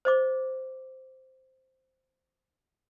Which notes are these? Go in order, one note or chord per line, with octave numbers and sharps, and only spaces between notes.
C5 D#5 D6